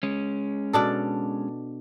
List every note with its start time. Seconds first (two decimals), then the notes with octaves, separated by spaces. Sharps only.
0.03 G#3 C#4
0.73 B2 D4 A4